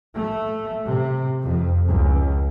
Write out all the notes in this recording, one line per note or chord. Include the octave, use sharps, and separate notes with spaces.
A3
C3
F2
C#2